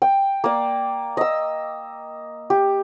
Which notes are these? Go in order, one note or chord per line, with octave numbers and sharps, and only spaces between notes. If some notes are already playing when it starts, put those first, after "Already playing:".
G5
A#3 D5
D#5 E6
G4